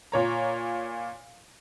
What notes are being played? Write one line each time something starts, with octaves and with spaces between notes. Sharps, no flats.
A#2 C#5 A#5